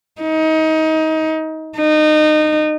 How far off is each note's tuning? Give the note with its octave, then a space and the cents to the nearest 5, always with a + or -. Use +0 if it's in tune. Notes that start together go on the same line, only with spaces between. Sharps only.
D#4 +25
D#4 -25